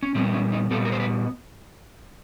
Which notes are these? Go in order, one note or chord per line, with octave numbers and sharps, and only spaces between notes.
C#4
A#2 G3 B3 C4
C#4
D#4
A#2 G3 B3 A4
A#4
C5
B4